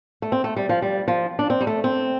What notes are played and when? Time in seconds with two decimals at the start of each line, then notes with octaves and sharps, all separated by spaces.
0.22 A3
0.32 C4
0.44 A3
0.56 G3
0.69 F3
0.82 G3
1.08 F3
1.39 D4
1.50 C4
1.61 G3
1.67 A3
1.84 C4